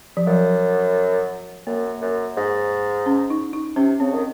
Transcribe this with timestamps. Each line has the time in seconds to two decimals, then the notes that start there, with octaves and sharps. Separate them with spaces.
0.17 F3
0.27 F#2 F#3
1.67 F#2 A#3
2.02 F#2
2.37 G#2
3.06 C#4
3.30 D#4
3.53 D#4
3.76 C3 C#4
4.00 C#3 C4
4.14 D#3